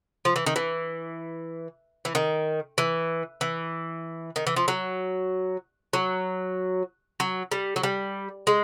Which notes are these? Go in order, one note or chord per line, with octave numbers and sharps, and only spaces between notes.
F3
E3
D#3
E3
E3
D#3
E3
E3
D#3
E3
F3
F#3
F#3
F#3
G3
F#3
G3
G#3